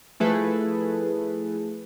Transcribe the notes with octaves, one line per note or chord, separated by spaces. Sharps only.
F3 A3 E4 G#4 A4 B4